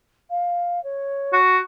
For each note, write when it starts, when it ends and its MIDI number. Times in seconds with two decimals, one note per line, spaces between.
0.30 0.82 77
0.83 1.38 73
1.33 1.58 66